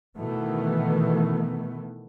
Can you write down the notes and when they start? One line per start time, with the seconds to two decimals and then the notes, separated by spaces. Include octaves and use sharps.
0.16 B2 D#3 E3 A3 B3